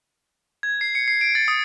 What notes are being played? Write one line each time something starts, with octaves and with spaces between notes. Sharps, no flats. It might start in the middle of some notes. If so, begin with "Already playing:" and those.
G#6
C7
C#7
C7
D7
A6
D#6